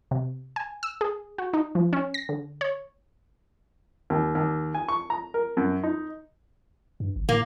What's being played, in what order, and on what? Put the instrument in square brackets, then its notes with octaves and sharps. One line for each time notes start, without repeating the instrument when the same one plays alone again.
[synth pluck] C3
G#5
E6
G#4
F#4
D#4
F3
C#4
A#6
D3
C#5
[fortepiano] D#2
D#2
G#5
C#6
A#5
A#4
F#2
D#4
[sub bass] G2
G#1
[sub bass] A2 [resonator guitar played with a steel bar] A#3